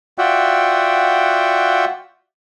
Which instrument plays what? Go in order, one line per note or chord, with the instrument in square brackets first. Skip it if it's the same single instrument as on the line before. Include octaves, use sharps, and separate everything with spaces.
[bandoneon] F4 F#4 D5 E5 F#5 G5